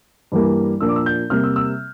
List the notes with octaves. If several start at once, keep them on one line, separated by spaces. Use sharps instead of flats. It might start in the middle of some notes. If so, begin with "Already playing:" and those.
G2 E3 G3 A#3
A#2 F3 A#3 D4 E6
D6
E6
G6
C3 G3 A#3 F6
E6
E6